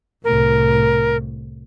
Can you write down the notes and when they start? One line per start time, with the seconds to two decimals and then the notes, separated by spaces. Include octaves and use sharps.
0.24 C2 A2 A#4